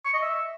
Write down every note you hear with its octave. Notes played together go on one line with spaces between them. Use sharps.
C#6
D#5
E5